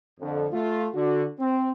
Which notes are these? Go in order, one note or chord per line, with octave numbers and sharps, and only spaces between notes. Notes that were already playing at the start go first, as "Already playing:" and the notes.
F2 D3
A3 F4
D3 F#4
C4